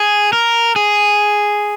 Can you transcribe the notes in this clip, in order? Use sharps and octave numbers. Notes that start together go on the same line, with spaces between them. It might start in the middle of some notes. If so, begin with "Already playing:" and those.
Already playing: G#4
A#4
G#4